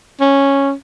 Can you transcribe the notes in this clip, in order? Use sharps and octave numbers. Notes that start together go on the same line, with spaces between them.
C#4